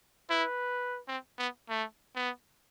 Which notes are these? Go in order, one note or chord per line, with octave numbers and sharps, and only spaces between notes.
E4 B4
C4
B3
A3
B3